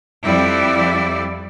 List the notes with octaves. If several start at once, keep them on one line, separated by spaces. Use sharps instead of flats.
F2 G3 E4 D5